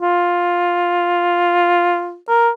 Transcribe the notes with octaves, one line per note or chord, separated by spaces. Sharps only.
F4
A#4